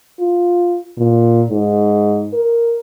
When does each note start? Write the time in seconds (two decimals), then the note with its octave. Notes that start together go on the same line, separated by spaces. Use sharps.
0.20 F4
0.97 A#2
1.49 G#2
2.34 A#4